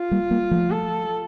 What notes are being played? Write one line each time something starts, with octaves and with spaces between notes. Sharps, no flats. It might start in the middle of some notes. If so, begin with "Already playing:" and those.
Already playing: F4
G3 A#3
G3 A#3
F3 A3
A4